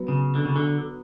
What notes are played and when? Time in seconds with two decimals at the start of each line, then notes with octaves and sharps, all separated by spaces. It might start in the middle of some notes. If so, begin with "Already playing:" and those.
Already playing: F#3 B3 F#4
0.08 C#3
0.35 D3
0.45 C#3
0.56 D3